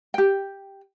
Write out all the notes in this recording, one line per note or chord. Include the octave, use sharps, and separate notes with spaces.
G4 G5